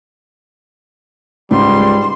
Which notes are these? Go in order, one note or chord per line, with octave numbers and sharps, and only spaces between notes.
C#2 G#2 G3 C6